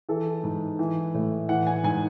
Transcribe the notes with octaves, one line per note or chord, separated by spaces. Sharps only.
E3 A4
G#2
E3
A2
E3 F#5
G#5
G#2 G#5